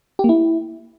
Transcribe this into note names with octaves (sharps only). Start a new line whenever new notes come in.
G4
A#3
E4